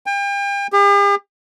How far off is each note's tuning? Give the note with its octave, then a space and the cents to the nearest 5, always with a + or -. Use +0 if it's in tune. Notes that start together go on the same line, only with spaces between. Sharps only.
G5 +40
G4 +45